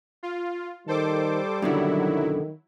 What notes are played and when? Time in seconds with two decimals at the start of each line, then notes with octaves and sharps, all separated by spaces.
0.23 F4
0.87 D#3 G3 A4 C5 D6
1.62 F#2 B2 D3 D#3 F#3 E4